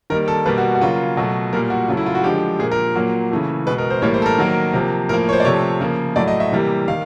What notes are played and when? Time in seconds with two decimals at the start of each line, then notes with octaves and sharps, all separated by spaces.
0.10 D#3 G3 A#3 A#4
0.28 A4
0.46 B2 G3 A#3 B4
0.58 F#4
0.75 F#4
0.81 C#3 F#3 A#3 F4
1.17 B2 F#3 A3
1.53 A#2 G3 A#3 A#4
1.70 F#4
1.88 C#3 F#3 A3 F4
1.97 E4
2.06 F4
2.15 F#4
2.24 D3 F3 G#3 G4
2.59 A#2 F3 A#3 G#4
2.72 A#4
2.95 A#2 F#3 A#3
3.31 C#3 E3 A3
3.66 B2 G#3 B4
3.78 A#4
3.90 C5
4.02 A2 E3 G3 A#3 C#5
4.14 C5
4.22 A4
4.26 A#4
4.38 D#3 F#3 A#3
4.73 C3 F3 A#3
5.09 A2 F3 A#3 A#4
5.29 C#5
5.33 C5
5.40 D5
5.45 C3 F3 A3 C#5
5.80 C#3 F3 A#3
6.16 A2 F#3 A3 D5
6.28 D#5
6.40 E5
6.52 C3 E3 G3 A#3
6.88 D#3 F5